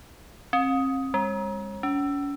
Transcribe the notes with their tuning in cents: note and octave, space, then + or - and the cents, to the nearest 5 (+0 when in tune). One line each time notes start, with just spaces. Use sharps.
C4 +40
G#3 -40
C#4 +40